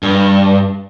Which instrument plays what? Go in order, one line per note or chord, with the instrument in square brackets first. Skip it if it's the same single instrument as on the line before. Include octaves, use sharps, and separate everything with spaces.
[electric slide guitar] G2